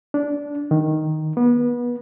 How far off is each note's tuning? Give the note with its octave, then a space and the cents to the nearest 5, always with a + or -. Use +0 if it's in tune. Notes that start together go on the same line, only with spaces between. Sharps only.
D4 -15
D#3 +0
B3 -30